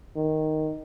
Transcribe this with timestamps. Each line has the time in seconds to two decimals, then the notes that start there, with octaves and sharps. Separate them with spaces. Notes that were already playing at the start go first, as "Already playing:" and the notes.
0.16 D#3